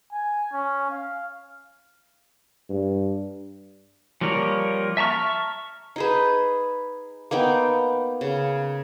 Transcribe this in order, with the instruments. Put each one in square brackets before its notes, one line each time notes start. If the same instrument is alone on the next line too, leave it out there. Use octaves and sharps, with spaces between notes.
[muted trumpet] G#5
C#4
F5
[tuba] G2
[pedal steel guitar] F3 G3 A#3 A#4 C#5
E5 A5 A#5 C#6 F6
[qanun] D#4 G#4 B4
A#3 B3 D#4 G5
C#3